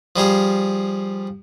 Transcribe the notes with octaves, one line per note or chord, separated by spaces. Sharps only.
F3 G3 G#4 F5